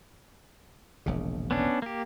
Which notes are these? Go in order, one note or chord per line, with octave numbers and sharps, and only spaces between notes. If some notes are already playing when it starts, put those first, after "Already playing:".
E1 A#1 C#3
B3 C#4 D4
A#3 G4